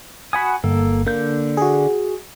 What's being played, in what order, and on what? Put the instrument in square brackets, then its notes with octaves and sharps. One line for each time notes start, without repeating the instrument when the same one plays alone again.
[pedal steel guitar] F#4 F#5 D#6 [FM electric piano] G#5 B5
[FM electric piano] G1 [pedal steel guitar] A#3 A4
[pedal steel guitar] D3 G6 [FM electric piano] A#3
[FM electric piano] F#4 G#4